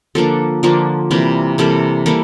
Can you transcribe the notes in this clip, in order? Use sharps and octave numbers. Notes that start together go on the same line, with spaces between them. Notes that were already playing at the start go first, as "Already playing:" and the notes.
D3 F3 A#3 D4 A4
D3 F3 A#3 D4
C3 E3 G3 A#3
C3 E3 G3 A#3 A4
E3 G3 A#3 A4